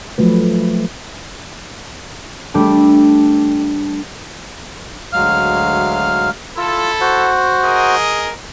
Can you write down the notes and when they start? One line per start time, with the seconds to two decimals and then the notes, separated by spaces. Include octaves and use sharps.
0.18 F3 F#3 A3 B4
2.54 G3 A3 D4
5.12 D2 F#3 G#3 F5 F6
6.57 E4 F4 A4 E6
7.01 F#4 C5 F#5
7.64 G#4 A#4 D#5